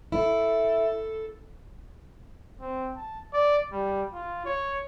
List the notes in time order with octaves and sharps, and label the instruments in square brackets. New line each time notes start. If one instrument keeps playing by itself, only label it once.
[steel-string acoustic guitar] E4 [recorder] A4
[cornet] C4
A5
D5
G3
F4
C#5